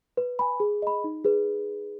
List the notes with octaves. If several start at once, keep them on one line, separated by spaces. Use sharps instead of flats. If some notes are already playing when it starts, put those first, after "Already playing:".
B4
G#5 B5
G#4
D#5 B5
D#4
G#4 B4